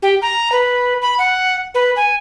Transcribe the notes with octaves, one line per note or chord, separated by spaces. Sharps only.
G4
A#5
B4
B5
F#5
B4
G#5